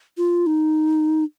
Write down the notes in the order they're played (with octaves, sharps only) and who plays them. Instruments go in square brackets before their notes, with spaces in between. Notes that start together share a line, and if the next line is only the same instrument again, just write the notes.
[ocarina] F4
D#4